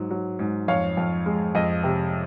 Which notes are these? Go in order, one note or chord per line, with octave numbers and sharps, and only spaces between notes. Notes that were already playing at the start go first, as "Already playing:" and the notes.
Already playing: G#2 F#3
F#3
G#2
F2 C#5 F5
F2
G#3
F2 D#5
C3